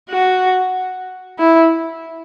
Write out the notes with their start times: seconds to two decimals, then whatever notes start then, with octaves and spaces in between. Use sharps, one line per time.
0.10 F#4
1.40 E4